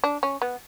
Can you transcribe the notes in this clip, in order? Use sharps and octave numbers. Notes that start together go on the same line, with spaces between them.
D4
C#4
B3